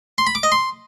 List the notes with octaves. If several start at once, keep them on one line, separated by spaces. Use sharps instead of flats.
C6
B5
D6
D#5
C6